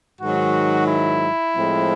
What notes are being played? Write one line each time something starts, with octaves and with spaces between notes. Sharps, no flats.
G#2 D#3 F#3 F#4
E4
A2 F3 G#3 C4